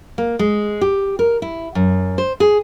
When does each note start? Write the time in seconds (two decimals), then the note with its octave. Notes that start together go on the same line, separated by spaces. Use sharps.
0.18 A#3
0.39 G#3
0.81 G4
1.19 A#4
1.42 E4
1.75 F#2
2.18 C5
2.40 G#4